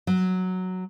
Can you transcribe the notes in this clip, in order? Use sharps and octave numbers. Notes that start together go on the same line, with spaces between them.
F#3